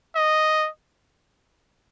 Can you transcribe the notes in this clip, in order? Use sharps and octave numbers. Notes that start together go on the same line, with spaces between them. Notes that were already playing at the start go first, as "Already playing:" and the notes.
D#5